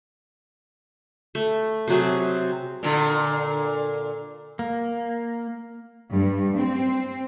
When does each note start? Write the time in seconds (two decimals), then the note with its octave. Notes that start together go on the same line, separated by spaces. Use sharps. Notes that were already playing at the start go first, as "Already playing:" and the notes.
1.35 A3
1.87 C3 F#3 G#4
2.83 A#2 D3
4.59 A#3
6.13 G2
6.60 C4